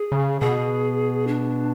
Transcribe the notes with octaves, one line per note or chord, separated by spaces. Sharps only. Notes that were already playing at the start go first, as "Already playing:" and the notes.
Already playing: G#4
C#3
B2 G#4
D4